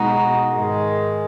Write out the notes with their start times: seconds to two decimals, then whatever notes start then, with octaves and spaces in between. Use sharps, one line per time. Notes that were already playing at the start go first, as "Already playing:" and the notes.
Already playing: B2 G#3 B3 D#4 F#4
0.51 G#2 D#3 G#3